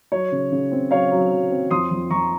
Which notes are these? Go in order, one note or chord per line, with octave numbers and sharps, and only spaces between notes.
F#3 C#5
C#3
C#3
C4
F#3 C#5 F5
F#3
F#3
C4
F2 C6 D#6
F2
F2 A#5 C#6